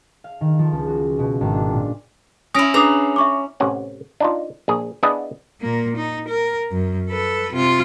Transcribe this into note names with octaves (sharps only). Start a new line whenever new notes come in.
F5
D#3
F3
C#2
F#4
B2
G#1
D4
A#2
C#4 E4 D#6 A#6 D7
D4 G#4 B4 A#5 D6 D#6
E5 C#6 D6
A1 C3 C#4 F#5
D4 D#4 F4
A#1 G#4
B3 D4 E4 G#4 D#5
A#2 A#3
D#4
A#4
F#2
A4 B4
C3 F4